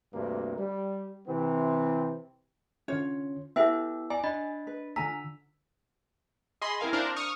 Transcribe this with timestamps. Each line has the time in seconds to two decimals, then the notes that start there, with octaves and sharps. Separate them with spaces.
0.14 D2 G2 C3 A#3
0.58 G3
1.28 C3 E3 C4
2.88 D3 C#4 F4 C#5
3.56 B3 E4 G4 A4 E5 G5 E6
4.10 D5 G#5 A#5
4.24 D4 D#5 B5 A6
4.67 B4
4.96 D3 F4 G#5 A#5 E6 B6
6.61 G#4 D#5 B5 C6
6.80 C4 E4 A#4 F5 G#5
6.93 D4 A#4 C5 F5
7.16 C#6 D#6 F6